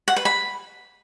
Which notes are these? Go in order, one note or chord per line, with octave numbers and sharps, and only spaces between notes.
F#5
B4
B5